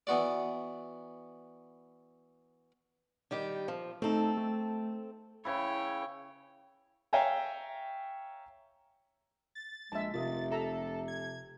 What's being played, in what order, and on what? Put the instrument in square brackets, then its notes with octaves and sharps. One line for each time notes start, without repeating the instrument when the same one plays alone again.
[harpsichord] E3 B3 F#4 D5
[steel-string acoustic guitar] D#3 G3 G4
F3
[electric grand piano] A3 D#4 [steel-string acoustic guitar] C4 A4
[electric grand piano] A3
[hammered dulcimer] C#3 E4 [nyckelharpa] C#5 G5
[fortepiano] C#5 E5 F5 G5 G#5 A#5
[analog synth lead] A6
[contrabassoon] A#1 [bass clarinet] G#3 [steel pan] E5 A5
[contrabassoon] F1 [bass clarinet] C3 [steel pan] F4 A#4 D#5 [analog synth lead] A6
[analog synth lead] A4 [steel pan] E5 A#5
[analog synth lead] G#6